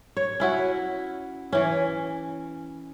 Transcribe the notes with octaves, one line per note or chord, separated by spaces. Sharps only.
C#5
C#4 E4 F#4
E3 C#4